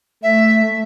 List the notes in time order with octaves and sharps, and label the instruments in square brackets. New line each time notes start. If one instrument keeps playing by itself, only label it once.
[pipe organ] A3 [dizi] E5